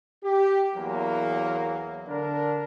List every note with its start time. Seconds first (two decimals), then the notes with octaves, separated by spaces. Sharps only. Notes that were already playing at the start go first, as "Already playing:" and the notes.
0.24 G4
0.75 E2 F#3 A#3
2.08 D3 D4 A#4